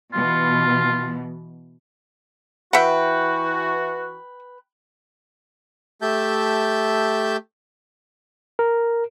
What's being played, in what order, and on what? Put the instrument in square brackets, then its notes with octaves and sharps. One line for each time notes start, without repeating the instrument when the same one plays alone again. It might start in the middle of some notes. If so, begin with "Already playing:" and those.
[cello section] B2 E3 [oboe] F4
[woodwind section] E3 F#4 [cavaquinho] B4 G5 [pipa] E5 F#5
[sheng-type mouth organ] A3 G4 E5 A5 G6
[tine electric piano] A#4